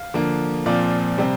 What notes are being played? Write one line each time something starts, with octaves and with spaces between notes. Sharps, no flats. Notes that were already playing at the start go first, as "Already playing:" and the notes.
Already playing: F5
D3 F3 A#3
A#2 F3 C4 D5 F5
C3 G3 C4